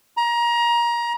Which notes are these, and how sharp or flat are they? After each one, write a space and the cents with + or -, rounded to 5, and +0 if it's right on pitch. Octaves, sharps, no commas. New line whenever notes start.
A#5 +25